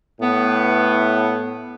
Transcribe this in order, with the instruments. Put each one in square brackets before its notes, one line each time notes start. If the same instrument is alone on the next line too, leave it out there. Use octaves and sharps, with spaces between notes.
[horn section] A2 B3